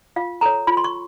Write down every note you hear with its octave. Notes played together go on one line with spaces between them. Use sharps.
F4 F5
A4 C#5 A#5
F4 B5
C6
C#6